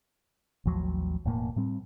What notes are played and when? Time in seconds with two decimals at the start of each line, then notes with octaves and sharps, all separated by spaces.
0.65 A1 D#2 F3 F#3
1.25 E1 A2 A#3
1.56 A2 G3 C4